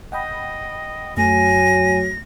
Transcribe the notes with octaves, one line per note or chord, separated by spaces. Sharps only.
D#5 F#5 G5 B5
F#2 F#3 A3 G#5 A#6